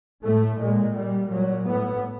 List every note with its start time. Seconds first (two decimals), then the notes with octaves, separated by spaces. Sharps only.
0.24 A2 A3
0.59 A#2 G#3
0.94 A#2 G3
1.29 A#2 F#3
1.65 A2 B3